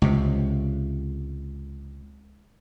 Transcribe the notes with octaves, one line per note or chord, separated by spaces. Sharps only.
C#2 C3